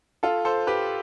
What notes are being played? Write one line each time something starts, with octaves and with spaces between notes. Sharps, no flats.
F4 A4
A4 C5
G4 B4